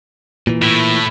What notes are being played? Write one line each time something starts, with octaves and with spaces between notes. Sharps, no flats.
A#2 E3
A2 E4